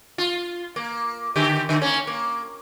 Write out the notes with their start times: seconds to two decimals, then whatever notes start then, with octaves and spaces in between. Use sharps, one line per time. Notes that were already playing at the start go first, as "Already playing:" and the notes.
0.18 F4
0.76 A#3
1.36 D3 G4
1.69 D3
1.81 A#3 C#4
2.07 A#3